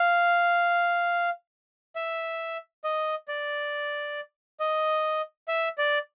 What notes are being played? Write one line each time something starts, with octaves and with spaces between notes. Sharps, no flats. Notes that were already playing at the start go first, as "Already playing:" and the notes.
Already playing: F5
E5
D#5
D5
D#5
E5
D5